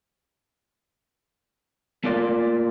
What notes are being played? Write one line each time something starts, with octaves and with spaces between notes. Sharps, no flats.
A3 A#3 F4 D5